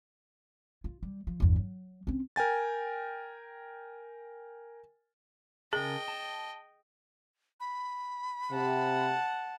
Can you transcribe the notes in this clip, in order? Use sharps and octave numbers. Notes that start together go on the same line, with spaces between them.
F4
G3
F3
G1 E2
F#3
C4 C#4
A#4 G5 G#5 A6
C#3 G#4 A#4 D#5 G5 A5
A5
B5
C3 F#5 A5